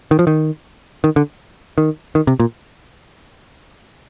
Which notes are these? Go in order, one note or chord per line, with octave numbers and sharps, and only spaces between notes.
D#3
F3
D#3
D#3
D3
D#3
D#3
C3
A#2